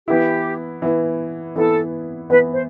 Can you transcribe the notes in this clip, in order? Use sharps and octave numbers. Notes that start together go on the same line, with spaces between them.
E3 B3 E4 G4
E3 B3 E4
E3 B3 E4 A4
E3 B3 E4 B4
C5